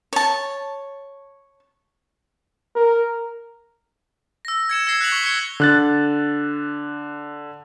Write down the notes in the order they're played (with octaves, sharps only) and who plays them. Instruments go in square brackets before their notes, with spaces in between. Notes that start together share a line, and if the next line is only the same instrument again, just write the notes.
[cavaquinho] C#5 A5
[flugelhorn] A#4
[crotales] E6 A#6
G#6 C#7 E7
E6 G#6 A#6 C7
F#6 B6 C#7 F7 F#7
C#6 B6 F#7 G7
G#6 C#7 G7
[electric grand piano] D3 F#6 A6